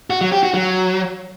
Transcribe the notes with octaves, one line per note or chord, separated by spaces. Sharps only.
F#4
F#3
G4
F#4
F#3